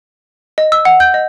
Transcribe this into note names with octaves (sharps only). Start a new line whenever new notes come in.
D#5
E6
F#5
G6
D#5